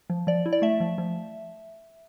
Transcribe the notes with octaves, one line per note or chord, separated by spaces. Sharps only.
F3
F3 D5
E4
D5
A3 E5
F3
F3